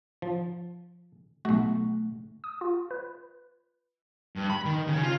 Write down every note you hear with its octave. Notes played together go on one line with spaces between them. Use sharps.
F3
B1 A3 F#4
D#6
F4
B4
G2
B5
D#3
C#3
F4